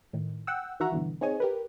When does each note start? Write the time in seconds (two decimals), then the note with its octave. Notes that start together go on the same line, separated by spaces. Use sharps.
0.13 A2 D#3
0.47 F#5 G5 E6
0.80 D#3 E3 F#4 E5 F#5 A#5
0.92 G2 B2 D3 E3
1.21 C4 D#4 G#4 C#5 D#5 G#5
1.40 G4 A#4 B4